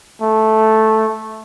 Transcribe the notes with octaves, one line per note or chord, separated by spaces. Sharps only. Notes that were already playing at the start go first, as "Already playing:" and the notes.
A3